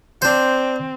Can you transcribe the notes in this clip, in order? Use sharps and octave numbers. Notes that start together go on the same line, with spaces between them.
C4 D4 C5